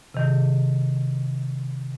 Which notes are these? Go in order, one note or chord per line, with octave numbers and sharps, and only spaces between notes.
C3 D#3